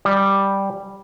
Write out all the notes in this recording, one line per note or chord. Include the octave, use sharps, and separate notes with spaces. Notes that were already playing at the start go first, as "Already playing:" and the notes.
G3